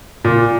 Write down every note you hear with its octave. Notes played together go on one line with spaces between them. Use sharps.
A#2